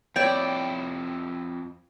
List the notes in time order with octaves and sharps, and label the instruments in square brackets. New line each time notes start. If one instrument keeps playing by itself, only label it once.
[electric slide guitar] F2 E4 [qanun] C#5 D5 [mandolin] G5